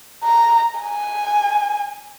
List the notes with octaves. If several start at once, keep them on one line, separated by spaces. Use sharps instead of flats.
A#5
G#5